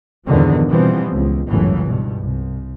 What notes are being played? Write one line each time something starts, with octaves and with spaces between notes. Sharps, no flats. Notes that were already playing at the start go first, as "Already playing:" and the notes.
E2 G2 A#2 D3 D#3 F3
B2 E3 F3 G3 B3 C4
C#2
G1 C#2 F#2 A2 C#3 E3
G2 B2
C2